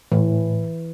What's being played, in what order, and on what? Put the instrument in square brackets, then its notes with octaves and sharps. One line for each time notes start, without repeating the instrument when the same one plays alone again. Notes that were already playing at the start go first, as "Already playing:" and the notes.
[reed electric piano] A2 [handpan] E3